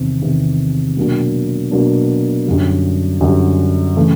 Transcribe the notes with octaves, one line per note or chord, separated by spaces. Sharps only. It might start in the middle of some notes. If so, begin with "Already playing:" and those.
Already playing: E2 C3 D#3
E2 C3 D#3
B2 F#3 A#3 D4
B2 F#3 A#3 D4
F#2 D3 G3
F#2 D3 G3
C#3 E3 A3